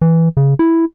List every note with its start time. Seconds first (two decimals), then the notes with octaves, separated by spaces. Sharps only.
0.01 E3
0.37 C#3
0.59 E4